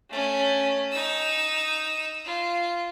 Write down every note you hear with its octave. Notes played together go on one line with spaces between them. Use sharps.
A3 C#4
D#4 E6
F4